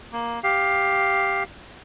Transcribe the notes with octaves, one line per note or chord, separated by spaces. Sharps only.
A#3
G4 F5